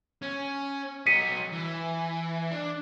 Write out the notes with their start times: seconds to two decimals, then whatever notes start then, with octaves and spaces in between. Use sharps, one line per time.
0.22 C#4
1.07 F#3 D#5 B6 C#7 D#7
1.52 E3
2.51 D4